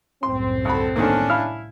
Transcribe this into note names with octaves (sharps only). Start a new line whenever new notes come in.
C2 F#2 A2 C4 C6
D2 A4 B5
D3 D#3 A#3 C#4 D4
E4 F5 F6